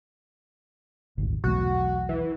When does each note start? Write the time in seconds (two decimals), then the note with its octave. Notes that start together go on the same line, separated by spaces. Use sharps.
1.17 D#1 G#1 D2
1.44 B1 E2 A3 F#4
2.09 E3